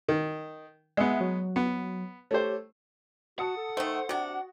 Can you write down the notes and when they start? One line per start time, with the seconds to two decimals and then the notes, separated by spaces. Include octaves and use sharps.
0.08 D#3
0.97 G#3 B3 E5 F#5
1.20 F#3
1.56 B3
2.31 A3 G4 C5 C#5
3.39 F#4 F#5 A5 D#6 C#7
3.57 A4
3.77 D#3 A3 C5
4.09 C3 D4 F#4